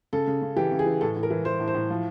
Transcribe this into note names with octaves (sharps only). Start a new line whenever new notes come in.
C#3 A4
C#3
C#3
E3 G4
C#3
G#4
E3
A2 A4
A2
A#4
E3
E3 C5
A2
C5
A2
F3